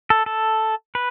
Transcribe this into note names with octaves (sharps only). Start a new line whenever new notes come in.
A4
A4
B4